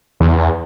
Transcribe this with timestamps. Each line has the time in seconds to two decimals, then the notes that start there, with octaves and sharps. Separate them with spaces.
0.20 E2